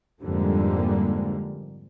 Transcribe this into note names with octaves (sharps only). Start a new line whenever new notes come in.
F2 G#2 D3 G3 G#3 A#3